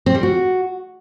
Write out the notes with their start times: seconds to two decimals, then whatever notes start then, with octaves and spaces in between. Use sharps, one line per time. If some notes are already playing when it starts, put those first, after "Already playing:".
0.06 C4
0.15 G3
0.23 F#4